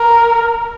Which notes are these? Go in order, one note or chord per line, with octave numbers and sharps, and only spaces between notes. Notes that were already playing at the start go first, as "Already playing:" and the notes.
Already playing: A#4